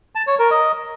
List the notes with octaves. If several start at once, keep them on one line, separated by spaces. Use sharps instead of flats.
A5
C#5
A#4
D#5